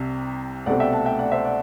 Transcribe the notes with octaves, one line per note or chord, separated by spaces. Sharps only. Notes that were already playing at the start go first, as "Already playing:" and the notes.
Already playing: C2 C3
C2 B2 A3 C4 D5 F#5
E5 G5
F#5 A5
E5 G5
D5 F#5
C5 E5
D5 F#5